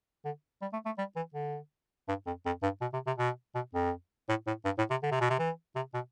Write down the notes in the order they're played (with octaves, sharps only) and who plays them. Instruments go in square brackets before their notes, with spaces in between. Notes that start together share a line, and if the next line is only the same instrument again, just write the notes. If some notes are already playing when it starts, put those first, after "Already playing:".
[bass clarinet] D3
G3
A3
A3
G3
E3
D3
G2
F2
F2
G2
B2
C3
C3
B2
B2
F2
A2
A2
G2
A2
C3
D3
C3
B2
C3
E3
C3
B2